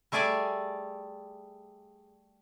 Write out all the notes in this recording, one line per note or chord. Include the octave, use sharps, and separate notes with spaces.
G3 A3 G#4 D5 E5 G#5